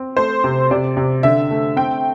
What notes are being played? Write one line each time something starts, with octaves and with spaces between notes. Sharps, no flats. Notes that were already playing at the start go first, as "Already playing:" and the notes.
Already playing: C4
A3 C5
C3
C3 D5
C3
D3 E5
A3
C4 G5